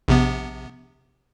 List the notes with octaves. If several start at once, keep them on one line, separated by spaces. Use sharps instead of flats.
A#1 C3 B3